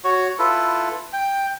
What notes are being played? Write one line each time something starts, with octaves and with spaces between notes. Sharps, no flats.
F#4 C#5
E4 F4 A4 B4
G5